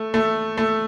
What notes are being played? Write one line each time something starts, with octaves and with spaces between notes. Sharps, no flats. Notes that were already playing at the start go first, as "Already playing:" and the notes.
Already playing: A3
A3
A3